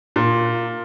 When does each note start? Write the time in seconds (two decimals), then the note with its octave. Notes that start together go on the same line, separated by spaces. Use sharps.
0.16 A#2